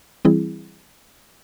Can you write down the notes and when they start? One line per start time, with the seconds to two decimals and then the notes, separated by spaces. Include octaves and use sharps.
0.25 E3 G3 C4 E4 G#4